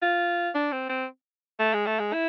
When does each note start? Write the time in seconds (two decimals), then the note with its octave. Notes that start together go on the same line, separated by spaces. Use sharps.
0.02 F4
0.55 D4
0.72 C4
0.89 C4
1.60 A3
1.74 G#3
1.86 A3
1.99 G#3
2.13 E4